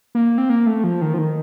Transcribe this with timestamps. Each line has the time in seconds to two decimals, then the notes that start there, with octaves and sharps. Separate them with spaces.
0.15 A#3
0.38 C4
0.50 A#3
0.67 A3
0.84 F3
1.02 D#3
1.14 F3
1.18 D#3